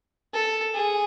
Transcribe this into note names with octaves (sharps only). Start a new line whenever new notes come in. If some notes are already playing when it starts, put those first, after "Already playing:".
A4
G#4